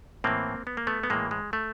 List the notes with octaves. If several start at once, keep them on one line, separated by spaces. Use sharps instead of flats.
A2 E3 A#3 C4
B3
A#3
A3 B3
B3
A2 E3 G#3 A#3
G#3
A3